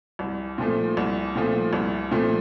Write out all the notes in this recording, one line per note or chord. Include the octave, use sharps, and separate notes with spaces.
C2
A#2 F3 A3
C2
A#2 F3 A3
C2
A#2 F3 A3